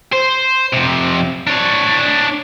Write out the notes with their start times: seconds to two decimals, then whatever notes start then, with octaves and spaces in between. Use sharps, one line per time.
0.13 C5
0.74 F2 C3
1.47 D4 C#5